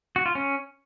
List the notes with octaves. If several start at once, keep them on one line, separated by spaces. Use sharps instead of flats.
F#4
F4
C#4